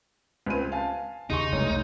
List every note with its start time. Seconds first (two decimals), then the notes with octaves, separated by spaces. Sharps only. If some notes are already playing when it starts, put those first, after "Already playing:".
0.46 C#2 C4 D#7
0.72 F5 G#5 A5
1.30 D#2 C#3 D#4 G#4 C6 C#6
1.52 F1 C2 G#3 A3 C#5